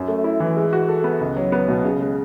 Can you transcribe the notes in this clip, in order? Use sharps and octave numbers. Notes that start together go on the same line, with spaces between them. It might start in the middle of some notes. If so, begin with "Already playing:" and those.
Already playing: F#2
A3
E4
E3
G#3
F#4
A4
B3
C#2
F#3
B3
B2
C#3
G#3